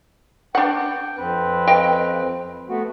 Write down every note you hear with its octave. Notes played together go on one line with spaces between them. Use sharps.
D4 F#5 G5
F2 C4 B4
D#5 F5 G5
A3 B3 F#4